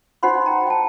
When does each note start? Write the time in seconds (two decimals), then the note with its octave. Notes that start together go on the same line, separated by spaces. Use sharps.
0.23 D#4 F#4 C5 F#5 B5 C6
0.46 G5 A#5
0.67 G5 A5